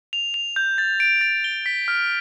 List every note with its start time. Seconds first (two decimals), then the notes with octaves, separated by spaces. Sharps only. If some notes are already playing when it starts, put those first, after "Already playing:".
0.13 F7
0.34 F7
0.56 G6
0.78 A6
1.00 D7
1.21 A6
1.44 G7
1.66 B6
1.88 F6